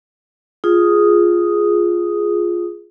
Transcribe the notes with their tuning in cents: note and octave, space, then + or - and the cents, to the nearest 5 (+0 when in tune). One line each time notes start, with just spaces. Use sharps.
F4 +0 G#4 +0 D#6 +0